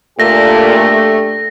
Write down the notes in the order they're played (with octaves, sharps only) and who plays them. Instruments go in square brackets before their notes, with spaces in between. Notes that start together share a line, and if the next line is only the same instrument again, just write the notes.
[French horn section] A#2 [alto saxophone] A3 [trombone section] D4 G4 A4 [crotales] A#6